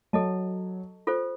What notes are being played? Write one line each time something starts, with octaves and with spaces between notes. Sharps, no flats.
F#3 A4 D#5 A5
F4 A4 C5